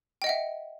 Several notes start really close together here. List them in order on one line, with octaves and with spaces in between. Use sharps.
G5 D#5 F#5 E5